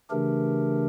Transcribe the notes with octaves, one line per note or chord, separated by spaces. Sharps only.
C#3 E3 A3 D4 G4 A#4